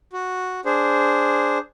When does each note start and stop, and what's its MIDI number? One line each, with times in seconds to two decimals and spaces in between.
0.13 0.61 66
0.65 1.58 62
0.65 1.58 68
0.65 1.58 72